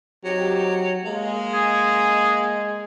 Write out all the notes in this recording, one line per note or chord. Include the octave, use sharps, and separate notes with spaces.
F#3 C4 D#4 G4
G#3 A#3
G#4